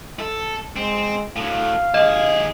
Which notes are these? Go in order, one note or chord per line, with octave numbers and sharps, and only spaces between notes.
A4
G#3 C4
A2 F#3 F5
D#2 G#4 D#5